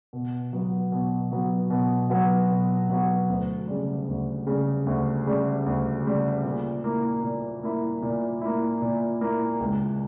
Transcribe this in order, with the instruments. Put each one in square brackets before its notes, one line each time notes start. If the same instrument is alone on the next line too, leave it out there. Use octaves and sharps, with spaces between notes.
[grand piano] B2
F#3 B3 F#4
B2
F#3 B3 F#4
B2
F#3 B3 F#4
B2
F#3 B3 F#4
D2
C#3 G3
D2
C#3 G3
D2
C#3 G3
D2
C#3 G3
A#2
A#3 E4
A#2
A#3 E4
A#2
A#3 E4
A#2
A#3 E4
C#2